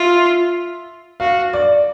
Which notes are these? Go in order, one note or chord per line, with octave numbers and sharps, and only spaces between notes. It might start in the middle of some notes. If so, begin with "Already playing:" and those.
Already playing: F4 E5
F#4 F5
D5